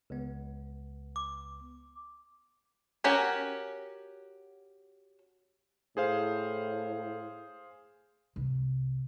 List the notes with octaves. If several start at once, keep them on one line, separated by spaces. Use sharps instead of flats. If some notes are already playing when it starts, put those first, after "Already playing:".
C#2 B3
D6
C#4 F#4 G4 A#4
A2 G#4 C5 F5
C2